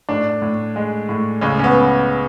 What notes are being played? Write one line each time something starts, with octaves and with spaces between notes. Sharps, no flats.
A2 D4
A2
G#3
A2
C#2 C#4
C#4
B3